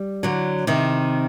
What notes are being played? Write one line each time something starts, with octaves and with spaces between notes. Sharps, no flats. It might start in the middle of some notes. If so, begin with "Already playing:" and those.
Already playing: G3
D3 F#3
C3 D#3